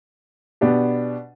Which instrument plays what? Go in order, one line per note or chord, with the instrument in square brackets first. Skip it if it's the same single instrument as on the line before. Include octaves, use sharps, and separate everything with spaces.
[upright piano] B2 B3 D4 G4